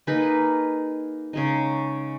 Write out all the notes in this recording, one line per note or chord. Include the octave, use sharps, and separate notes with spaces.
A#3 D#4 G#4 B4
C#3 G#3 D#4